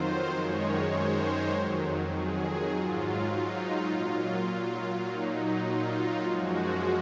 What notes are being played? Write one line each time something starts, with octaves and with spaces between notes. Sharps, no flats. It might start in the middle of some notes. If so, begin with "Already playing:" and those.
Already playing: F2 D#3 F#3 F4 C5
F#2 D#3 G#3 C#5
C5
F2 D#3 F#3
G#4
G#2 F#3 F4
D#4
A#2 F#3 F4
A#2 F#3 D#4
F4
F#2 F3 G#3 F#4